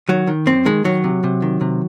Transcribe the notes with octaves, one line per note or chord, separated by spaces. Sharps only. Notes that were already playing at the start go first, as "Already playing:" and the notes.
D#3 F#3
D#3
F#2 C4
D#3 G#3
D#3 F#3
C3
C3
D#3
C3